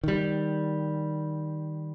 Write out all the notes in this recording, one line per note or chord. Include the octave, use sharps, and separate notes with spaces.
D#3 G3